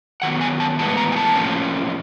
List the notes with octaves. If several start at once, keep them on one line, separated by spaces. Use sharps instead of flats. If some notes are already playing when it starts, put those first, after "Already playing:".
D#3 F#3 B3 F#5
G#5
A5
A2 E3 G#3 B3 A5
A#5
G#5
A5
A2 F3 A#3 C#4